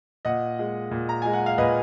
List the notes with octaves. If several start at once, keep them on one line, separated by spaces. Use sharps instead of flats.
A#2 D#5 F#5
G#3
A#2
A#5
G#3 G#5
F#5
F5
A#2 B4 D#5